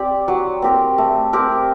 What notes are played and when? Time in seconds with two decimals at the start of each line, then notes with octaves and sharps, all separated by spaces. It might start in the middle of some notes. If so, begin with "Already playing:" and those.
Already playing: C4 G4 D5
0.28 F#3
0.62 C4 G4 A#4
0.98 A3
1.33 C4 G4 A#4